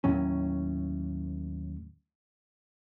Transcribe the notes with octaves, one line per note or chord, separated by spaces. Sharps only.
D#2 A2 F#3 C#4